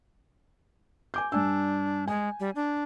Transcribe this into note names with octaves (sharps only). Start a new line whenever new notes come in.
G#5 D6 G6
G2 D4 G#5 E6
G#3 G#5
G3
D4